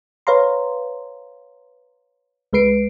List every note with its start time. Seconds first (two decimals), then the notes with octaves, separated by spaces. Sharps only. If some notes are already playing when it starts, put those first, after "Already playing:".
0.27 B4 C#5 F5 A#5 C6
2.53 C#2 G#3 B4 C7 D7